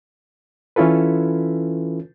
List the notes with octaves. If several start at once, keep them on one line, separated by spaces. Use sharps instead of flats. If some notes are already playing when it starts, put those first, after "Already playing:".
E3 C#4 E4 F4 A4 B4